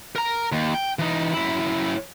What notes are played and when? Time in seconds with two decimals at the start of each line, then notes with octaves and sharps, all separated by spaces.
0.16 A#4 A#5
0.52 D#2
0.74 G5
0.99 E3 D#4
1.34 F#2 E4